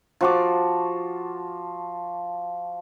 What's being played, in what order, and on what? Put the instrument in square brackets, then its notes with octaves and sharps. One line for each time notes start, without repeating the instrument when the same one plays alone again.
[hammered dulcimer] F3 F#4 D6